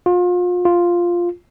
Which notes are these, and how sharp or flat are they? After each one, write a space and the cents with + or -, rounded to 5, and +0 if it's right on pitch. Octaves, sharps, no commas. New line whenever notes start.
F4 +35
F4 +0